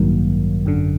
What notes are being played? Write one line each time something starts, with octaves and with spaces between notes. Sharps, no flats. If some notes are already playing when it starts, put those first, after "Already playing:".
Already playing: A1 G2 D#3 F#3 A#3
G#1 F#2 D3